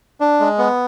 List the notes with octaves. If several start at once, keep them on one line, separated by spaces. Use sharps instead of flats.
D4
G#3
B3